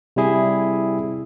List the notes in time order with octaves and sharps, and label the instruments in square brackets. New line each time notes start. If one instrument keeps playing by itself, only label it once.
[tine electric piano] C3 G3 E4 G#4